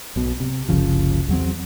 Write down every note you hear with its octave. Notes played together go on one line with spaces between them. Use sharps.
B1 B2
C3
F#1 C2 C#3 F3
E2 F#3 C4